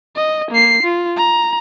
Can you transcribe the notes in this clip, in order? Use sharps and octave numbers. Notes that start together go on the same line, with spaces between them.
D#5
A#3 C7
F4
A#5